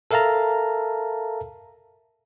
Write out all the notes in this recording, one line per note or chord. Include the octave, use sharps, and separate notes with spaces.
A4 A#4 E5 F5 A5 A#5